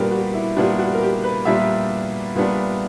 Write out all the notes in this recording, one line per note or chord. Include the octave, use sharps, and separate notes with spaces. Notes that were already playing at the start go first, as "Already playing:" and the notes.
Already playing: A#2 G3 B3 D4 G4 A#4 B4
F#4
E4
A#2 G3 B3 D4 F#4
F#4
A#4
G4
B4
A#2 G3 B3 D4 E5
A#2 G3 B3 D4